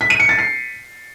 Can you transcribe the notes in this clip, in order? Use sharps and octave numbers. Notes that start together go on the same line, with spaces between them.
B6
D#7
C#7
A6
C7